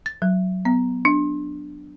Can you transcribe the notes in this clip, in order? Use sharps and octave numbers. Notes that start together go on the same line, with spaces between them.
A6
F#3
B3
D4